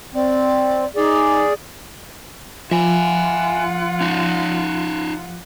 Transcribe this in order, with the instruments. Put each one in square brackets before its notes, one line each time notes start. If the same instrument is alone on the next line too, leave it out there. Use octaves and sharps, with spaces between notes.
[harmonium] C4 [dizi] D5
[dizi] D#4 [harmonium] G#4 D5
[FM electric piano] F3 [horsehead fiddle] F4 F#5 [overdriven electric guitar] E5 G#5
[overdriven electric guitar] C#4 D#4